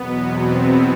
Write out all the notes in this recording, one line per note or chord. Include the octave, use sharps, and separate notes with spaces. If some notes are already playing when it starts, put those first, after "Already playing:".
Already playing: E2 B2 F#3 B3
C4